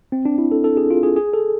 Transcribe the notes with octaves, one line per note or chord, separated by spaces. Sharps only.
C4
D4
E4
A4
A4
G#4
F4
G#4
G#4
A4